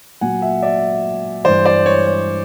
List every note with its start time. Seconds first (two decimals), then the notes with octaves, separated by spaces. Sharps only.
0.21 A#2 F#3 F#5 G#5
0.42 E5 F#5
0.62 D5 E5
1.45 G2 E3 C5 D5
1.65 C5 D5
1.86 C#5
2.07 C#5